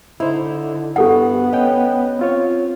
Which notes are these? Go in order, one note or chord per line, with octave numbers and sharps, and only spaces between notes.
D3 D#4 E4 C5
G2 B3 G4 A4 F#5
C#4 D#5 G5
C4 F4 C#5